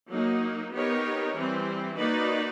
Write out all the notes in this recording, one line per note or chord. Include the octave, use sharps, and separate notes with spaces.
F#3 A#3 D#4
B3 D#4 G4 A#4 C#5
E3 G3 C4
A#3 D#4 F#4 B4 D5